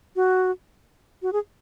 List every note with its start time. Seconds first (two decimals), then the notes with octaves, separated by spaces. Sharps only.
0.16 F#4
1.22 F#4
1.33 G#4